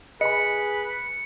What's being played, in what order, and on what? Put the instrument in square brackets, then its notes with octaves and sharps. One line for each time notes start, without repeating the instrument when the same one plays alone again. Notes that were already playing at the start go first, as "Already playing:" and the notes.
[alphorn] G#4 [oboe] B4 [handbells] D#5 B5 [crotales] C#7